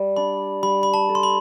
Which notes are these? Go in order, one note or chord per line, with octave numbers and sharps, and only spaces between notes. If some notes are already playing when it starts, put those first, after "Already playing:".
Already playing: G3
D4 B5
G3 B5
B5
A5
A4
C6
B5